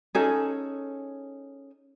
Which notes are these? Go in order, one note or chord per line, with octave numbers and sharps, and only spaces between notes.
C#4 D#4 G#4 A4